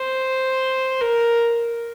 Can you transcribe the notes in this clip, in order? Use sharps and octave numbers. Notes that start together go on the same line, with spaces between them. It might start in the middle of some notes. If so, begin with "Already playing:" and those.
Already playing: C5
A#4